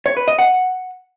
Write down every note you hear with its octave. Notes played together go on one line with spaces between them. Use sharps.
C#5
B4
D#5
F#5